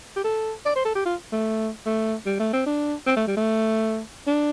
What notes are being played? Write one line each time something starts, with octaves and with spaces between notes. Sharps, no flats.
G4
A4
D5
C5
A4
G4
F4
A3
A3
G3
A3
C4
D4
C4
A3
G3
A3
D4